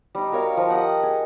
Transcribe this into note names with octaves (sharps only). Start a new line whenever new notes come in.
G3 D#4
F#4 A#4 C#5 F5
F3
G4 D#5 F#5 G5
G#4